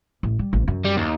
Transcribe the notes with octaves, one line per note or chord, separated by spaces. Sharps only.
A1
G3
A1
F#2
G3
D#2